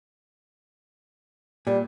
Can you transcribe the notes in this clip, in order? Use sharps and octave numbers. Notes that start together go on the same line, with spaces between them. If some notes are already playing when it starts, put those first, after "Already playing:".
A#2 G3